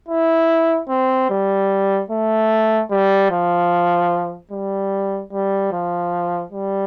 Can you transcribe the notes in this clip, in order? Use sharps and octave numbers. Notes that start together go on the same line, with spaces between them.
E4
C4
G3
A3
G3
F3
G3
G3
F3
G3